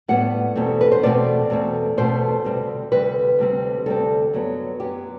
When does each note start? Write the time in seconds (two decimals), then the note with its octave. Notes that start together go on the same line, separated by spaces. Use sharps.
0.08 A2 G3 B3 F#5
0.56 E2 B2 A3 C4
0.81 B4
0.92 C5
1.03 E2 B2 A3 C4 D5
1.50 E2 B2 A3 C4
1.97 E2 B2 A3 C4 C5
2.44 D2 C3 G3 C4
2.92 D2 C3 G3 C4 B4
3.39 D2 C3 G3 C4
3.86 D2 C3 G3 C4 A4
4.33 F#2 F#3 B3
4.80 F#2 F#3 B3 G4